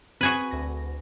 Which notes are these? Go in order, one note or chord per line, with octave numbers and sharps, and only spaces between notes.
C4 F#4 G#4 B4
D2 A#6